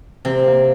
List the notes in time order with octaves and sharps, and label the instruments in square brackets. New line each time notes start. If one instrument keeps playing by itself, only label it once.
[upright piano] C3 [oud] C4
[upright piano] A#3